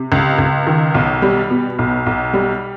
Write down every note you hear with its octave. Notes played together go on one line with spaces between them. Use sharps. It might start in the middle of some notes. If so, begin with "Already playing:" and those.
Already playing: C3
C#2
C#2
D#3
B1
G3
B2
B1
B1
G3